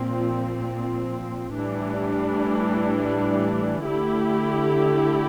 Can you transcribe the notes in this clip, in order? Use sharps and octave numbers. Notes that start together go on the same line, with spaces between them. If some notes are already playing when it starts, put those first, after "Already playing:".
Already playing: A#2 F3 C4
A2 E3 G3 D4
D3 A3 E4 G4